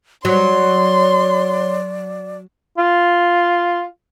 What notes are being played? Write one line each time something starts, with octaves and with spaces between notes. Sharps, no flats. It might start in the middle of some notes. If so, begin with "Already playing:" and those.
F#3 C#5 D5 C6
F4